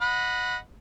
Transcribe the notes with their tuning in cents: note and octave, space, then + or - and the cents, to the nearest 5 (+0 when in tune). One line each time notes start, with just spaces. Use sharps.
D#5 -5 F#5 -20 B5 +0